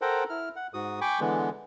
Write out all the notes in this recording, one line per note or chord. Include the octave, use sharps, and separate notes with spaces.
A4 A#4 C5 F#5 G5 A#5
E4 F6
F#5
G#2 F#4 D#6
G5 G#5 B5 C#6 D6
D3 E3 G#3 B3